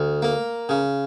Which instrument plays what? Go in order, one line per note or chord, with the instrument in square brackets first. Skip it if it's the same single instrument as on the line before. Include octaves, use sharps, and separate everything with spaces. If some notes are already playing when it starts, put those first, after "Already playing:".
Already playing: [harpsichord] D2
A#3
C#3